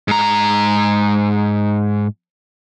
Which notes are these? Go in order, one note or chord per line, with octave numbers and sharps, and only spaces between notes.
G#2 A#5